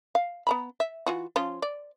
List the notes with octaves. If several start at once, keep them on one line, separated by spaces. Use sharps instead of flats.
F5
B3 A#5 B5
E5
E3 F4 F#4
F3 C#4 F4
D5